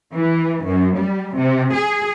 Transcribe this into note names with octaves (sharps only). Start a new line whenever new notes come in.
E3
F#2
G3
C3
G#4